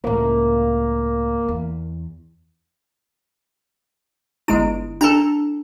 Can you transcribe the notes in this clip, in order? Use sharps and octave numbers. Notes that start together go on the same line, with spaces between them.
C#2 A2 A#3
E2
G1 G#3 E4 D7
D4 A4 A5 A#5